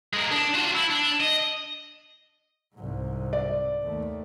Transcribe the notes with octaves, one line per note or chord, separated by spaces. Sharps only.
G#3 A#3
D4
F4 F#4
E4
D4
D#5
C2 G#2
D5
D#2 A3